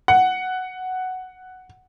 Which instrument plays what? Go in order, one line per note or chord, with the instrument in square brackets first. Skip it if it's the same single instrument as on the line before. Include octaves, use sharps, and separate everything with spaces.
[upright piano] F#5